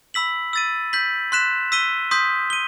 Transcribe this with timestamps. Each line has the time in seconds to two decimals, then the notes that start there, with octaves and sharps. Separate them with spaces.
0.14 B5 E6 B6 F#7
0.53 E6 A6 D#7
0.93 G6 B6 F#7
1.32 C6 F#6 B6 E7
1.72 E6 B6 D#7 G7
2.11 C6 D#6 G6 B6
2.50 D#7 G7